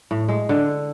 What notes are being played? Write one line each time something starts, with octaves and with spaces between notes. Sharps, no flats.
A2
G#3
D3